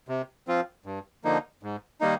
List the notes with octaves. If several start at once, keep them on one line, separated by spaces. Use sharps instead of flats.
C3
F3 C4 F4
G2
D3 F3 A#3 D#4
G#2
D#3 G3 A#3 D#4